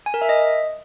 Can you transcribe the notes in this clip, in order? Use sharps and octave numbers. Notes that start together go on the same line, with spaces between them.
G#5
A#4
E5
D#5